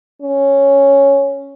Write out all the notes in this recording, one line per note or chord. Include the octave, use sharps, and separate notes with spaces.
C#4